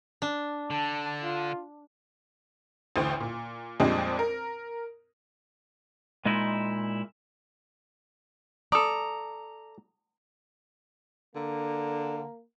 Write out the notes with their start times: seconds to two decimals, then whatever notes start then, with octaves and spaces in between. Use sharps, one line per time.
0.22 D4
0.70 D3 A5
1.23 F4
2.96 A1 D2 A2 C5 G5
3.20 A#2
3.80 F2 A#2 G3 G#3 C4 D4
4.19 A#4
6.25 A#2 G#3 A#3 D#4 E4 D#5
8.72 A4 D5 A#5 C#6 D#6
11.35 D3 A#3